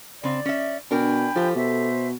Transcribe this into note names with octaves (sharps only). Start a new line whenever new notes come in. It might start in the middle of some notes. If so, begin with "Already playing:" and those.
C#3 C4 D5
C#4 E5
B2 D4 A#4 G5 G#5 B5
F3 G4 A4
B2 C5 E5